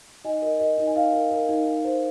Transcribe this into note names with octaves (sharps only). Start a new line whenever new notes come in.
D#4 D#5 G#5
A#4 D#5
A#4 D#5
D#4 D#5
G#5
D#4 F5
A#4
A#4
D#4
D#4
C5